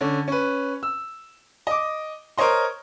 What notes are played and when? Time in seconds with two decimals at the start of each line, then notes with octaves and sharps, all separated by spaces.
0.01 D3 C#4
0.28 C#4 B4
0.83 E6
1.67 D#5 D6
2.38 A#4 C5 C#5 D#5 C6